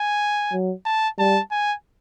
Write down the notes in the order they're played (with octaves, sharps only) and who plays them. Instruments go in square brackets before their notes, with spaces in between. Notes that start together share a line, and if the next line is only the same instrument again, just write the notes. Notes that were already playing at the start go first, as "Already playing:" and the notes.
Already playing: [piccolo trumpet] G#5
[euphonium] F#3
[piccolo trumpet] A5
[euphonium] G3 [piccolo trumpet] A5
[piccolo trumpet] G#5